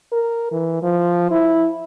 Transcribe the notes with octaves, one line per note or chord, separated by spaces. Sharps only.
A#4
E3
F3
E4